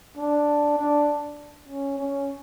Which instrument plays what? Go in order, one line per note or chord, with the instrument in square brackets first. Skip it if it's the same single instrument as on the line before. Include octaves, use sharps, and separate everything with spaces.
[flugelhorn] D4
D4
C#4
C#4